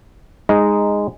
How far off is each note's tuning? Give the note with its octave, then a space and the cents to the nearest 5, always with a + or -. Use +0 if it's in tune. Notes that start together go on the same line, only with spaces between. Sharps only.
G#3 -10 D#4 +0